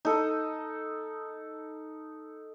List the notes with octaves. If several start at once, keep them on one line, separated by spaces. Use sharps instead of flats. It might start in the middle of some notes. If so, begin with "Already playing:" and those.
D#4 A4